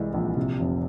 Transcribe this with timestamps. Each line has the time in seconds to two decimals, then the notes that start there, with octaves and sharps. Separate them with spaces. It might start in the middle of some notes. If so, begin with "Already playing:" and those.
Already playing: C2 E3 G#3
0.14 A#1
0.37 C3
0.59 F1